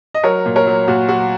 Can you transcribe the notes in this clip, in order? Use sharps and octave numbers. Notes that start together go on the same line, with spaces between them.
D#5
F#3 A#4 C#5
A#2
A#4 C#5
F#3
A#2 F#4
F#3 F#4